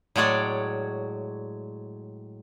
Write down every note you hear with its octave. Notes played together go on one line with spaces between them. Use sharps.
A2 F#3 G#3 C#5 D5